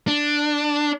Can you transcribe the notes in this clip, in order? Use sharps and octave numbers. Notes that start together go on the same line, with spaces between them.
D4